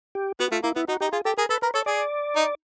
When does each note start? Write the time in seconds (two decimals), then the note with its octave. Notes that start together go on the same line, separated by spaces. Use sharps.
0.15 G4
0.40 B3 F#4
0.52 A3 F4
0.64 A#3 E4
0.76 B3 E4
0.88 D#4 F#4
1.01 D#4 G4
1.12 F4 G#4
1.25 G4 A4
1.38 G#4 A#4
1.49 A4 B4
1.62 A#4 B4
1.74 A4 C#5
1.86 G#4 D5
2.36 D#4